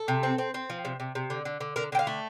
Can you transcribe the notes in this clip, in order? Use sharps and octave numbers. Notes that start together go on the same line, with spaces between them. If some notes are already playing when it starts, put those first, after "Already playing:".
Already playing: A4
C3
C4
C4
C4
F3
C3
C3
C3
D3
D3
D3
D3 A#4
D3 G5
F5
A3